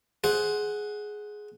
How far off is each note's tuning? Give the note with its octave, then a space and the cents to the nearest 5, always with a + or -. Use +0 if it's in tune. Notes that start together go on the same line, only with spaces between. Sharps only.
G#4 +10 C5 +0 F#5 +0